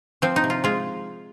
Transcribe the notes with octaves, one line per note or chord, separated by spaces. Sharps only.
F3 C4
D#4
C3
F4
G#3 F4